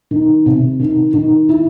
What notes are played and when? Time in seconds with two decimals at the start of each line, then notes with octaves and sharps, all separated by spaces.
0.11 D#3
0.46 C3
0.80 D#3
1.14 D#3
1.49 E4